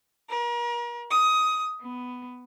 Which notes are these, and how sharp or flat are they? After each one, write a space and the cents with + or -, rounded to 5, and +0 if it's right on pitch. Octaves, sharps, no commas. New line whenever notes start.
A#4 +40
D#6 +15
B3 +10